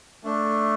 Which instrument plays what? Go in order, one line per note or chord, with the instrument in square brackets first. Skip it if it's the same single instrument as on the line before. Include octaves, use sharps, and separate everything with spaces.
[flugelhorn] A3 [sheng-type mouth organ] D4